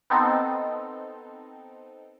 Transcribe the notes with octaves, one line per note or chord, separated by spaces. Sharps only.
B3 C4 D#4 A4